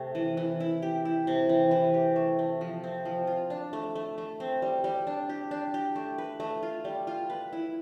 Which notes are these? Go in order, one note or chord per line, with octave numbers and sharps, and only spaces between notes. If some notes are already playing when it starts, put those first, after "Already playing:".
Already playing: C3 A3
E3
E3
E4
G4
E4
C3
E3
E3
G4
A3
A3
F3
C4
F3
F4
D4
A3
A3
A3
C4
G3
G3
D4
G4
D4
G4
A3
B4
A3
F4
G3
F4
B4
E4